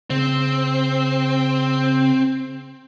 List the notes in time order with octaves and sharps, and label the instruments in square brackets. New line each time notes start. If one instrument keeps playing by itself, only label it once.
[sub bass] C#3 [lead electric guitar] C4